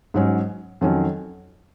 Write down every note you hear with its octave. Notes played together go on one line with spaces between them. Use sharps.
G#2 F#3 C#4
F2 D#3 F#3 C#4